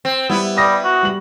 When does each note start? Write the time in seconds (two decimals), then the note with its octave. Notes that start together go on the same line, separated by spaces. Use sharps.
0.05 C4
0.30 G3 B3 E4
0.57 G3 E5 D#6 A#6
0.84 F#4
1.03 G3 F#7